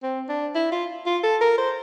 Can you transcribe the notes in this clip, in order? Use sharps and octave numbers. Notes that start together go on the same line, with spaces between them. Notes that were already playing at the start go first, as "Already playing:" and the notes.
C4
D4
E4
F4
F4
A4
A#4
C5